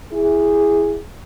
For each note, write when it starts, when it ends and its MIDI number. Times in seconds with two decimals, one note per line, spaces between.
0.13 0.99 64
0.13 0.99 68